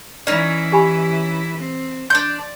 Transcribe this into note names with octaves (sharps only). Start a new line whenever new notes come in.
E3 C#4 D#4 E4 D5
G4 G#5 B5
C4
D4 D5 C6 G6